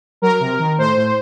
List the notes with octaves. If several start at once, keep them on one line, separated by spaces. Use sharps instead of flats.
F#3 A#4
C3
D#3
A2 C5
A2